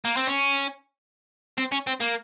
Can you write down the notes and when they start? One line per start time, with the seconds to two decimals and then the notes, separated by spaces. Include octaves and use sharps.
0.05 A#3
0.17 C4
0.27 C#4
1.58 C4
1.72 C#4
1.87 C4
2.00 A#3